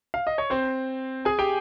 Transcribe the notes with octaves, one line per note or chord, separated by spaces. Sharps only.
F5
D#5
C#5
C4 C5
G#4 G#5
G4 G5